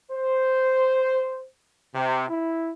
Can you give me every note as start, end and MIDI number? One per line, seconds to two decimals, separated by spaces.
0.12 1.46 72
1.95 2.29 48
2.29 2.71 64